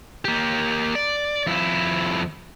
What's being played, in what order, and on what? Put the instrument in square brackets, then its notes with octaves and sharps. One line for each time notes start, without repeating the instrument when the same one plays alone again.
[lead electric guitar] A#3 G4
D5
F2 E4